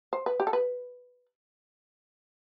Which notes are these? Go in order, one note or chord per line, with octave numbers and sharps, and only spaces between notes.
C5
B4
G4
A4
B4